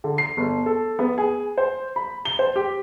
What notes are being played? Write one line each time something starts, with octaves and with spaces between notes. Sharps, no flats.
D3
C7
G1
A4
B3
G#4
C5
B5
G7
C5
G4